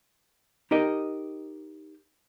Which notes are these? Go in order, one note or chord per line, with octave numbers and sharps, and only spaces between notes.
D#4 G4 A#4 D#5